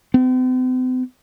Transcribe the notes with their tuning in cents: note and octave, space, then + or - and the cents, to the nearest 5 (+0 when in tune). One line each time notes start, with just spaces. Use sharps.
C4 -45